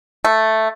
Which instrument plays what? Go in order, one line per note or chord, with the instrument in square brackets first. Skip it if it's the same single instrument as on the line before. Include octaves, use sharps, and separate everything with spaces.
[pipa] A3